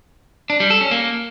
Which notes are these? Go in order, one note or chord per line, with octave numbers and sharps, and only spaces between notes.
D4
G3
A4
C#4
A#3